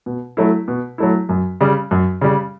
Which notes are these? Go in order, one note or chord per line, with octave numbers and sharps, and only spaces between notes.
B2
F#3 A3 E4
B2
F#3 A3 E4
F#2
C#3 G3
F#2
C#3 G3